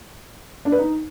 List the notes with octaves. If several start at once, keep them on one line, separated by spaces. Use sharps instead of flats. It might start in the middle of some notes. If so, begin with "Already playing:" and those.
D4
B4
D#4